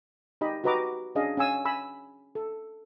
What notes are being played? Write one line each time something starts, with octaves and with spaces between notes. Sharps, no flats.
D#4 G4 D#5 B5
F#4 G4 B4 D#5 A#5 D6
C#4 D4 G#4 D#5 F5
C#4 F5 G#5 E6
G#5 B5 E6
A4